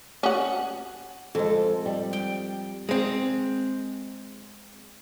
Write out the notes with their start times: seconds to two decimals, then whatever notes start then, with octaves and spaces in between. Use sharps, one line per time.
0.23 C#4 F#4
1.35 F2 G#3 A4
1.86 G3
2.13 G5
2.89 G#3 C4